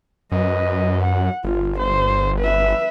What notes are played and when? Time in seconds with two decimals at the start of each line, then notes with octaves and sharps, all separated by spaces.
0.32 F#2 B4 D#5
1.03 F#5
1.44 G1 F4
1.79 C5
2.39 B4 E5